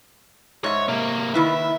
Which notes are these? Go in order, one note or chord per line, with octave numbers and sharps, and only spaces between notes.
G#2 C#5 E5
C3 A#3
D#3 E4 B4 E5